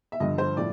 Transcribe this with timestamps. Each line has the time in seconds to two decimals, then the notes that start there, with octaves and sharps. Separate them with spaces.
0.12 E5
0.20 G2 D3 F3 D#5
0.38 C5
0.57 A2 F3 D5